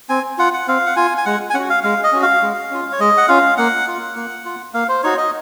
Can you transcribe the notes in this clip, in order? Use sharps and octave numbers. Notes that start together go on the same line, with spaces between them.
C4 G#5
F4 F#5
F#5
C4 F5
F#5
F4 G#5
G#5
G#3 F#5
G#5
C#4 F#4 F#5
F5
G#3 F5
D#5
C#4 F#4
F5
G#3
C#4 F4
C#5
G#3 D#5
F#5
C#4 F4 F5
A#3 F#5
F4
A#3
F4
A#3 F5
C5
D#4 F#4 C#5
D#5